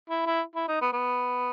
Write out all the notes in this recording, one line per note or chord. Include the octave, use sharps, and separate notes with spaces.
E4
E4
E4
D#4
B3
B3